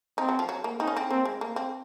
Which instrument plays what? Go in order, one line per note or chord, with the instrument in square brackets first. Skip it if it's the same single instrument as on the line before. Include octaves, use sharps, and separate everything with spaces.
[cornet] C4 [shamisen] D#4
[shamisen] F#3
F3
F#3
A#3
[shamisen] C4 [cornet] D#4
[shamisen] C#4
C4
[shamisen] A#3 [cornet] C4
[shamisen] G#3
A#3
C4